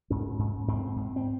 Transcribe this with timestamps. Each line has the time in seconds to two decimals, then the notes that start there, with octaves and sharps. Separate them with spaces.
0.10 G#2 C#4
0.39 G#2
0.68 G#2 C4
0.96 G#2
1.16 C4